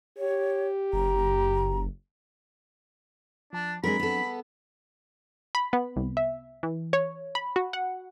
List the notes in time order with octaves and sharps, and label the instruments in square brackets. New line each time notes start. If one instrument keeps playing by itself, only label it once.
[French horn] G4 [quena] C#5
[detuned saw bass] F#1 [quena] A#5
[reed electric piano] F3 A5 [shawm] D4
[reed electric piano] F#3 C4 D4 [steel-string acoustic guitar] G#3 A#4 [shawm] B5
[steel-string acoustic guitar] B3 A4
[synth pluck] B5
B3
C2
E5
E3
C#5
B5
F#4
F#5